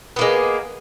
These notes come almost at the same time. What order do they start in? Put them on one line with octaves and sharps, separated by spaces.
B3 A#3 G#3